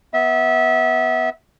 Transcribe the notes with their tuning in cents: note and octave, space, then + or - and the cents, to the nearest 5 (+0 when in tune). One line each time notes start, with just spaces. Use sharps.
B3 +0 E5 -25